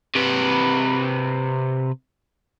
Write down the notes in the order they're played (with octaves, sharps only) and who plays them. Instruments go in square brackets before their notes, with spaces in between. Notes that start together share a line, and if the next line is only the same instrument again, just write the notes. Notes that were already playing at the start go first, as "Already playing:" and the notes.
[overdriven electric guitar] C3 B4